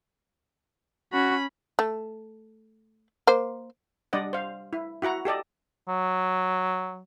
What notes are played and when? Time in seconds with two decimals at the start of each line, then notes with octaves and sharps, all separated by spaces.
1.13 C#4 F#4 B5
1.79 A3
3.27 A#3 C5
4.13 G3 D4 D5 D#5 F#5
4.33 C5 F5
4.73 E4
5.02 E4 F#4 F#5 A#5
5.25 G4 A4 D5 D#5
5.88 F#3